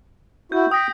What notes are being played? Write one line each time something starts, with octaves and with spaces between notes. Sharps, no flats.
E4 F#4 G6
G5 D#6 A#6 B6